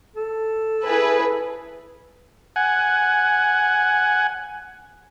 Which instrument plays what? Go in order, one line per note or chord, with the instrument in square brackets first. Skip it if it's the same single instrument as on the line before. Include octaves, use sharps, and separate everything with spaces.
[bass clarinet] A4
[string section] E4 G#4 B4
[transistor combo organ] F#5 G#5